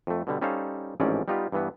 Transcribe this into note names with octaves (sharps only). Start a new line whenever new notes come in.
F2 A3
B2 D3 G3
G3 C#4 D#4 A4 C5 F5
A1 G#2 F3 C4 C#4 D5
G3 B3 D#4 F4 G4
G2 E3 B3